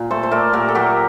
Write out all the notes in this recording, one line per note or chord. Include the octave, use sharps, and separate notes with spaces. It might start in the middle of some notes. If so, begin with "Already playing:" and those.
Already playing: A#2
A3 A4 C5
C5
A3 A#4 D5
A#2 G4 A#4
A4
F#3 G4 A#4